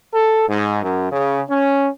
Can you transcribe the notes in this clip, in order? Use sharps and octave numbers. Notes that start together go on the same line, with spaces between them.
A4
G#2
F#2
C#3
C#4